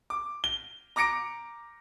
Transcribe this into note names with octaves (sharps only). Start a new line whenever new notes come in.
D6
G7
A#5 D6 A#6 C#7 D7